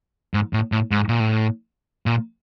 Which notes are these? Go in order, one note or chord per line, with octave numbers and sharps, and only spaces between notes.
G#2
A2
A2
G#2
A#2
A2
A#2